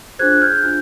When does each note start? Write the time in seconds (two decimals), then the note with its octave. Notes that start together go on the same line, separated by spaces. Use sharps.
0.19 D4 F4 G#4 C5 F#6 G#6
0.41 F6 G6
0.64 D4 F4